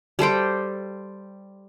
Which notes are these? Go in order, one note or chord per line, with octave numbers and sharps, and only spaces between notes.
G3 A4 C5 G5